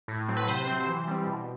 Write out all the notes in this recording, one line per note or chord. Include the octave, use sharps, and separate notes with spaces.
A2
F#3 C4
B4
C3 C5
F#3 C4
E3
G3 C4
B2